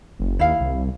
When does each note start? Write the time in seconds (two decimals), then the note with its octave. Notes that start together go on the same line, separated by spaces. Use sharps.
0.19 F#1
0.39 D#2 E4 F5
0.60 C2